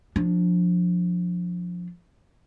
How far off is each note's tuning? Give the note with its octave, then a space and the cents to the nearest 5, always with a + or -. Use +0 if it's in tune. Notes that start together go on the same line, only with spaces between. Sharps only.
F3 +20 D4 +0